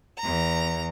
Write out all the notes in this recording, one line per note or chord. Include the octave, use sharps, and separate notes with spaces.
E2 A#5